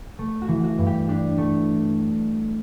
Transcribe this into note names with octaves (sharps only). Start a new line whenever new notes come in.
A3
F#4
E3
F#4
G2
G4
D4 G4
A3